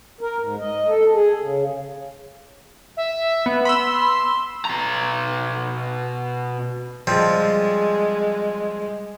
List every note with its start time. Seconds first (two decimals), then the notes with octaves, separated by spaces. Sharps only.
0.21 A#4
0.40 G#2
0.60 D#5
0.88 A4
1.14 G#4
1.40 C#3
2.97 E5
3.46 B3
3.65 B5 C6 E6
4.65 B2 A#5
7.07 F3 G3 G#3 C4